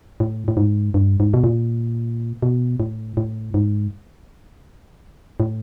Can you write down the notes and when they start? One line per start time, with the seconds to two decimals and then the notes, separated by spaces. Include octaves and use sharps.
0.20 A2
0.48 A2
0.57 G#2
0.94 G2
1.20 G#2
1.34 B2
1.44 A#2
2.42 B2
2.80 A2
3.17 A2
3.54 G#2
5.40 A2